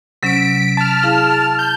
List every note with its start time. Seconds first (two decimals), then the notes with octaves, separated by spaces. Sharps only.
0.23 C3 F#3 C#4 B6 D7
0.77 A5 F6
1.03 E4 G#4 F5
1.59 G6